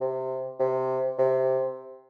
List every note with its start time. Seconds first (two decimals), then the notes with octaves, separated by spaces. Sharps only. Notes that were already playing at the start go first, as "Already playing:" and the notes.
0.01 C3
0.59 C3
1.19 C3